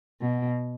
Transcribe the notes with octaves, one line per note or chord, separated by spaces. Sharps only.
B2